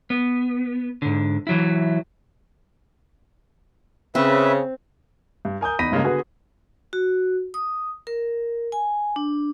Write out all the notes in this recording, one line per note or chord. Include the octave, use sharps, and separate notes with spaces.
B3
G#2 D3
E3 F#3 E4
C#3 C4 B4 E5
G2
A#4 G#5 D#6 G6
E2 D#4 B5 A#6 B6 D#7
G2 C#3 G#3 A#3
D3 B3 F#4 G#4 B4
F#4
D#6
A#4
G#5
D4